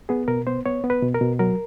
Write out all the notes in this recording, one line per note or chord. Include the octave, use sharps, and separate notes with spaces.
B3 G#4
B2 A#4
B3 C5
B3 C#5
B3
B4
B2
A#4
B2
F#3 A#4